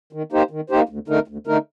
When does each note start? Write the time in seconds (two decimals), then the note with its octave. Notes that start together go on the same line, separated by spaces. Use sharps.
0.13 D#3
0.32 A#3 D#4 G4 C5
0.51 D#3
0.70 A#3 D#4 G4 C5
0.89 D2
1.08 D3 A3 D#4 A#4
1.28 D2
1.47 D3 A3 D#4 A#4